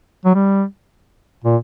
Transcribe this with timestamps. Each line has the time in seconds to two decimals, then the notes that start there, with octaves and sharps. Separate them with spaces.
0.25 F#3
0.35 G3
1.44 A#2